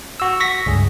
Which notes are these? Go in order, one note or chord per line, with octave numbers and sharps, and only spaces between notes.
F#4 E6
C#6 A#6 B6
C#2 G2 G#4